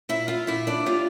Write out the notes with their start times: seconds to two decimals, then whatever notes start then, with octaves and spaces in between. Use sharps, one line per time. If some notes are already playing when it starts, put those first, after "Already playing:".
0.09 A#2 E4 E5
0.28 F4 F5
0.47 A#2 E4 E5
0.67 D4 D5
0.86 G3 F4 F5